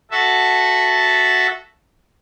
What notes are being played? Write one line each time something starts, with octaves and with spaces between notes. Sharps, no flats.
F#4 A4 E5 A5